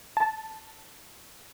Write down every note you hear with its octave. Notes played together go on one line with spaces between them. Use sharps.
A5